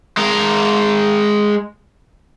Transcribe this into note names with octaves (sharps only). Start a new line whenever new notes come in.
G#3 A#4